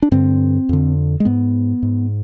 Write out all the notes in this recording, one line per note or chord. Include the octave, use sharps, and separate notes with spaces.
D4
G2 D3 C4
F2 D3
G#3
G#2 B3
G#2